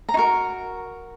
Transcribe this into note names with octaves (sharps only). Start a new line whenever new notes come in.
A#5
D#4 F#4 A#4 C#6